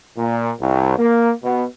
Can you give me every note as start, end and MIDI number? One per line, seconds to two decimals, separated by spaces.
0.17 0.50 46
0.60 0.94 36
0.98 1.32 58
1.44 1.64 47